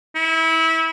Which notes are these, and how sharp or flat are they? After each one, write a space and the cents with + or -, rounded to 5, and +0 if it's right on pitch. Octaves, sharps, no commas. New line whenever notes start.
E4 -25